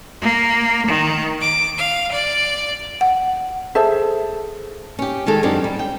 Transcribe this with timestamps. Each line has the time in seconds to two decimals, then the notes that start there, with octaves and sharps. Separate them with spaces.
0.21 A#3
0.86 D#3
1.40 D6
1.77 F5
2.11 D5
3.01 F#5
3.75 G#4 A4 C5 E5
4.99 C#4 G4
5.26 D#3 G#3 G4 A4
5.43 F#2 C4 D4 D#4 G4
5.64 G3
5.79 G5